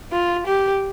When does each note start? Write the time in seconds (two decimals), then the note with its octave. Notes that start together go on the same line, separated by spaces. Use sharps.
0.12 F4
0.46 G4